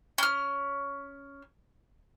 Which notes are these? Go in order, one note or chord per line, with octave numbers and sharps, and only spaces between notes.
C#4 F6